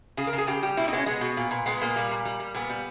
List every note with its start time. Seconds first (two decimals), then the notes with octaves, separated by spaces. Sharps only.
0.17 C#3 G#4
0.27 A#4
0.33 C#3
0.38 G#4
0.47 C#3 G4
0.62 G3 G4
0.77 B2 E4
0.88 D#4
0.93 G#3 B3
0.97 C#4
1.06 G#3 B3
1.21 B2
1.37 A#2
1.51 A#2
1.66 G#3 B3
1.81 A#2 A#3
1.96 G3
2.11 A#2
2.25 G3
2.40 G3
2.55 A#2 B3
2.70 G3